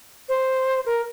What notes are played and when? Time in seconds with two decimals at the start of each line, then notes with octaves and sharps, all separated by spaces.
0.29 C5
0.86 A#4